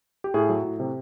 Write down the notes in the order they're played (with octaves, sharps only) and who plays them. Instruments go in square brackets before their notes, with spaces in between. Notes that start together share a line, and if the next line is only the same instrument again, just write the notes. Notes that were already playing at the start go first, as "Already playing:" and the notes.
[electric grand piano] G4
A2 G#4
F#3
A2
C3